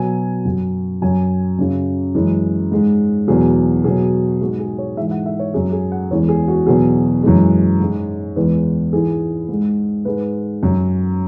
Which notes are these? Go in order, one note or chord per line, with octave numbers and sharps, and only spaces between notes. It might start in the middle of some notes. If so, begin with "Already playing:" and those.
Already playing: B2 F#3 G#5
F#2 F#3
F#2 F#3 G#5
F#2 C#3 F#3
F#2 E3 G#3
G#2 G#3
E2 B2 F#3 G#4
B2 F#3 G#4
G#2 G#3 F#4
G#4
C#5
G#2 E3 G#3 E5
F#5
E5
C#5
F#2 F#3 G#4
G#4
F#5
E2 E3 G#3 C#5
G#4
F#4
E2 B2 F#3 G#4
F#2 E3 G#3
G#2 G#3
E2 E3 G#3 B4
G#2 E3 G#3 G#4
G#2 G#3
G#2 G#3 B4
F#2 F#3